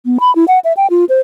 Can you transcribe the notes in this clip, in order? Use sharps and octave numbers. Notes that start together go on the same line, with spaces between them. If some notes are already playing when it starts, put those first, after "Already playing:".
B3
B5
E4
F#5
E5
G5
F4
C5